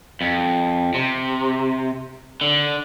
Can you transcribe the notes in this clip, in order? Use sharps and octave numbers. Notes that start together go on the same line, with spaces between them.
F2
C3
D3